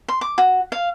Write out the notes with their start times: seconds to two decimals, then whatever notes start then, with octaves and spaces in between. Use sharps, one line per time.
0.08 C6
0.21 D6
0.38 F#4
0.72 F5